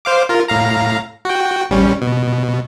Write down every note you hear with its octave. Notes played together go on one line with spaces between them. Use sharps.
C5 F5 D6
F4 A#4
A2 F5 A#5
F#4 G5
A1 G3 C#4
B2